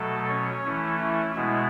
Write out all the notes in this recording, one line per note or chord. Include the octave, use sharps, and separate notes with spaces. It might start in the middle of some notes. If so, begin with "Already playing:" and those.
Already playing: B2 F#3 A3 A4
C#4 C#5
E3 A3 C#4 E4
E4
B2 G#3 B3 E4